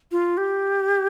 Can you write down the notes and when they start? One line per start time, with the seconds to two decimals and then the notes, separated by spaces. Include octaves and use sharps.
0.12 F4
0.37 G4